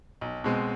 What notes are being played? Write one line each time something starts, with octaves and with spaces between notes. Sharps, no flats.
B1
B2 G#3 C4